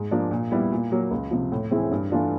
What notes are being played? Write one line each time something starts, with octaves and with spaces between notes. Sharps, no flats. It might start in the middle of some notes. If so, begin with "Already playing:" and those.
Already playing: G#2
F3 A#3 D4
A#2
G3 B3 E4
A#2
F#3 A#3
C#2
C3 F3
A2
E3 G#3 C4 E4
G2
E3 A3 D4 F4